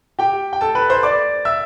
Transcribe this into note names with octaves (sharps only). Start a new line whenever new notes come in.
G4 G5
G5
A4 A5
B4 B5
C5 C6
D5 D6
E5 E6